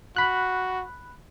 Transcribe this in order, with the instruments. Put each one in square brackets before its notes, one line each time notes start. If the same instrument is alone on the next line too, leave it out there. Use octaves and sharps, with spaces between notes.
[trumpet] F#4 [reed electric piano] B5 F#6